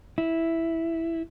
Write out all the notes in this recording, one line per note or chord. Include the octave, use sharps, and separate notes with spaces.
E4